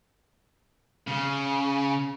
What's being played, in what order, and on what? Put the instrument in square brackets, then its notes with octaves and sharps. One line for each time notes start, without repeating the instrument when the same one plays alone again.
[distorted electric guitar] C#3